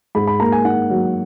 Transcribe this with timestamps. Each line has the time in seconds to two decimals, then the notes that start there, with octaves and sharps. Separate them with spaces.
0.15 G#2 B5
0.27 B5
0.40 A#3 A#5
0.52 G#5
0.64 D#4 F#5
0.90 F#3